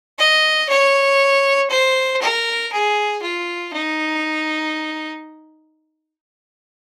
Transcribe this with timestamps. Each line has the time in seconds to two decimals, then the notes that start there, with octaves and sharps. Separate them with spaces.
0.19 D#5
0.69 C#5
1.70 C5
2.22 A#4
2.72 G#4
3.22 F4
3.73 D#4